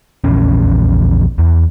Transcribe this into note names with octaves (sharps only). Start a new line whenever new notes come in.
A#1 E2 C#4
E2